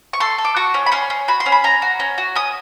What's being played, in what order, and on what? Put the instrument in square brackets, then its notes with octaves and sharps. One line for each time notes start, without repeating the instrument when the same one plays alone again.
[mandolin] C#6
A4 C6
A4
D6
F#4 C#6
C#4
B5
C#4 C6
C#4
F#4 B5
C6
C#4
B5
C#4 A#5
F#4
C#4
F#4
C#4 D#6